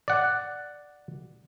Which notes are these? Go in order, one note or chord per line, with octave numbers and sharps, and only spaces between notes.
D5 F#5